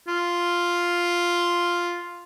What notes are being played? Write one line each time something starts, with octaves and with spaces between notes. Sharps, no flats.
F4